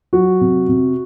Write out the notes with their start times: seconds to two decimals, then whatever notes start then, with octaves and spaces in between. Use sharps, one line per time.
0.13 F#3 F#4
0.41 C3
0.69 C3